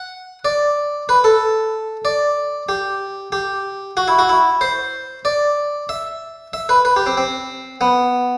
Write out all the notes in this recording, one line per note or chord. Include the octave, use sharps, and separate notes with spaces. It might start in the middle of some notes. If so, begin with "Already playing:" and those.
Already playing: F#5
D5
B4
A4
D5
G4
G4
F#4
E4
F#4
E4
C5
D5
E5
E5
B4
B4
G4
C4
C4
B3